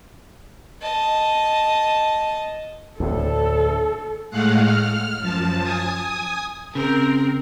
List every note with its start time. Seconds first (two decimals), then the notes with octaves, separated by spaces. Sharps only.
0.82 D#5 A5
3.00 D2 A2 A4
4.30 A2 G#3 A3 F5 F#5 F#6
4.62 F6
5.19 F#2 F3 A5
5.62 G#5 D#6
6.75 C#3 C4 A#4